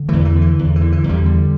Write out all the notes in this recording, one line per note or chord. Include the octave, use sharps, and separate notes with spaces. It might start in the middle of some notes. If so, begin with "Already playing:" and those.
Already playing: D3
E2 E3 A3
E3
D3
E3
E2
E3
D3
E3
E2
D3 G3
D3